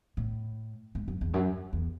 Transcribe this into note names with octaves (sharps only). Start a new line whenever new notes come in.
A2
G#2
F#2
E2
F#2
E2